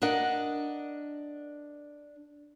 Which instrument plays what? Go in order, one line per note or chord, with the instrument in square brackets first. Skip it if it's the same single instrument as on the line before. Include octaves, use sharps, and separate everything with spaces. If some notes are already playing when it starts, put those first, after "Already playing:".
[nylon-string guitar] D4 A#4 D#5 F#5